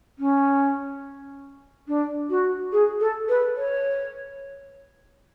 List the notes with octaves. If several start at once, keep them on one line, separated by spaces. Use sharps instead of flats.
C#4
D4
F#4
G#4
A4
B4
C#5